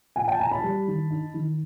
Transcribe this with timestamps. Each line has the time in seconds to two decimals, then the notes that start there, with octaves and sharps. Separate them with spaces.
0.16 A#2 F#5 G#5
0.28 G5 A5
0.39 A#2 G#5 A#5
0.52 A5 B5
0.64 G3
0.87 D#3
1.10 D#4
1.34 D#3